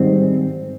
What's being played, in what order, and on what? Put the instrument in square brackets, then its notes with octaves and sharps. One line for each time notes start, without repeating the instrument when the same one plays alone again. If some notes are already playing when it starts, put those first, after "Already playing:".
Already playing: [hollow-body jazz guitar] G#2 D#3 G3 C4